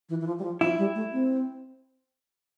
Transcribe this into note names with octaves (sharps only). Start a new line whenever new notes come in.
E3
E3
F3
G3
F3
F3 E4
G3
A3
C4